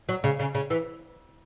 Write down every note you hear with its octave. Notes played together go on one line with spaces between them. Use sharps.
F#3
C#3
C#3
C#3
E3